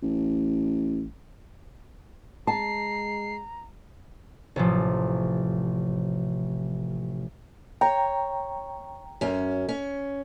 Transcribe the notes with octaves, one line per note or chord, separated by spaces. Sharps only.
A1
G#3 A5 A#5 C7
A1 C3 F3
C#5 G5 A#5
F#2 C#4
C#4